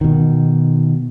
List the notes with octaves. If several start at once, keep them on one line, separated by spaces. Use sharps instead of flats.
B2 D#3